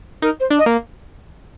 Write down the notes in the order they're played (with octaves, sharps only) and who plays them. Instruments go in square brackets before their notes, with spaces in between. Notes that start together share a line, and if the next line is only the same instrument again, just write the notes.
[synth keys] D#4 [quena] A#4
[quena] C5
[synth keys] D4
[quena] D#5
[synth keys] A#3